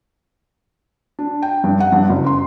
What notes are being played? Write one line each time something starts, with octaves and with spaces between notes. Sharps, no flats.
D4
G5
G2
F#5
G2
F#1
C6